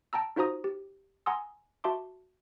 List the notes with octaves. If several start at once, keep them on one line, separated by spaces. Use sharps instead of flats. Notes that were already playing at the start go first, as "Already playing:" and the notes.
G5 A5 A#5 E6
D#4 F4 F#4 C5 A#5 D#6
G4
F#5 G#5 A#5 C6 D#6 E6
F#4 E5 A5 C6 D6